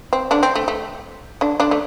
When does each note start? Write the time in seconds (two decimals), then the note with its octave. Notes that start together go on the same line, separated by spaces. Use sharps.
0.13 C4
0.31 D3 D4
0.43 C4
0.55 A3
0.68 A3
1.41 D3 D4
1.60 D3 D4
1.71 A3